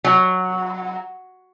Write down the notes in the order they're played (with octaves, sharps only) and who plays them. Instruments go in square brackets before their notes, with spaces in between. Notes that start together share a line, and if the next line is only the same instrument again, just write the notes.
[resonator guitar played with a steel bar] F#3